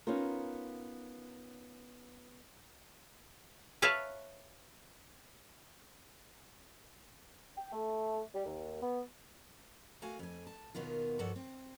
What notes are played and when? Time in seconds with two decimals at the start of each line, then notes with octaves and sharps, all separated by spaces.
0.07 B3 C#4 D#4 F4 A#4
3.82 B4 C#5 E5 F5 A5
7.56 G5
7.72 A3
8.34 G3
8.46 D#2
8.82 B3
10.02 A3 F#4 F5 G#5
10.19 F2 G#5
10.47 A5
10.75 D#2 B2 D#3 B3 F4
11.19 G2 F3 F#4 A4 D5 F#5
11.36 C4